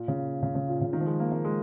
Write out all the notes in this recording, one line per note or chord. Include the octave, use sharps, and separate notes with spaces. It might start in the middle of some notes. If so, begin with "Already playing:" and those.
Already playing: A#2
C#3
C#3
C#3
A#2
C#3
D#3
F3
G#3
A#3
A#3
G#3